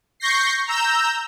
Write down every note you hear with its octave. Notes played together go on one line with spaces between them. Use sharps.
C#6 G6 A#6 C7
A#5 E6 G6